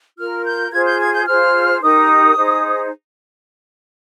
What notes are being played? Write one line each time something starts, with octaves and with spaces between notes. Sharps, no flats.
F4 A#4 F6
G6
F4 G#4 C5 G#6
G6
G#6
G6
F4 G#4 C5 F6
D#4 G4 A#4 D#6
D#4 G#4 C5